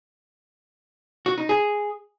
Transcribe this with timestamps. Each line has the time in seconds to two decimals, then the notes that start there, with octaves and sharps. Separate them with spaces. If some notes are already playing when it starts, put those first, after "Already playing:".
1.26 F#4
1.38 D#4
1.49 G#4